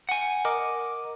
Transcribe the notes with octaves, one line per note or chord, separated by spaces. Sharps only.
F#5 G#5
A#4 D#5 D6